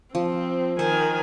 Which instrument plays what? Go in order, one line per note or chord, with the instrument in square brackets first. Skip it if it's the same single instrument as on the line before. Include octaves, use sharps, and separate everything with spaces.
[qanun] F3 [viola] C4
[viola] D#3 G#5 [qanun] C5